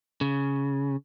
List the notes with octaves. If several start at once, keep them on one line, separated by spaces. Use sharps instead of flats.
C#3